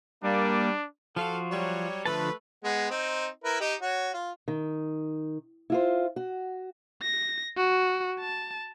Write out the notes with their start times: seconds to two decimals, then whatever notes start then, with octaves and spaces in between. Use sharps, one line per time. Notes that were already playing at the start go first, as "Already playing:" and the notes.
0.24 G3 A#3 D4
1.16 F3 F4 F#4 A4 F5
1.52 F#3 G3 C#5
2.06 D3 F3 A3 B4 A5
2.64 G#3 B3 F#5
2.91 C4 D#4
3.44 E4 A#4 B4
3.60 D#4 G4 D#5
3.81 F#4 C#5
4.13 F4
4.48 D#3
5.70 E4 F4 C5
6.16 F#4
7.02 A#6
7.57 F#4
8.20 A5